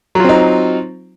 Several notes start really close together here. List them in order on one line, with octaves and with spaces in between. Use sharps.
F#3 F4 C4 D#4